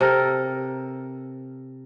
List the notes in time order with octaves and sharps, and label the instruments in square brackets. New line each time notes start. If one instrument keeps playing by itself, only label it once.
[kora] C3 A4 A#4